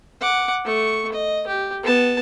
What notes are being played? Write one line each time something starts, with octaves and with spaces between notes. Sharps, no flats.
F#5 D6
A3 C#6
D#5
G4
B3 A5